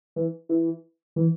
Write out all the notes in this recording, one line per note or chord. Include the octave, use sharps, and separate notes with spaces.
E3
E3
E3